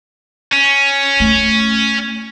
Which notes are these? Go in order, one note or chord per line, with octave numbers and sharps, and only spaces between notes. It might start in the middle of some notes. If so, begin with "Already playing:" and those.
C#4
A3 E4